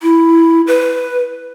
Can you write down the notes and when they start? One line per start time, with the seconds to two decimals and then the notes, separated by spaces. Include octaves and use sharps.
0.02 E4
0.67 B4